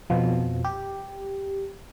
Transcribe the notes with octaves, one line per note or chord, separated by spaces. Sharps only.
F2 B2 F3
G4